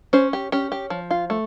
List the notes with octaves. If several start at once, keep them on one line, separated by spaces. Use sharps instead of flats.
C#4 C5
G4
C#4 G4
G4
F3
F4
A3